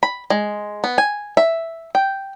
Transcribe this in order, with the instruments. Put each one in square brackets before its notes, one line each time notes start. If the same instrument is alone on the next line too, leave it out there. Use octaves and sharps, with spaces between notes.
[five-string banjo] B5
G#3
B3
G#5
E5
G5